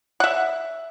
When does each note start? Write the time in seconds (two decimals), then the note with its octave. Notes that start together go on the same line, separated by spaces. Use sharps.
0.20 E5 F#5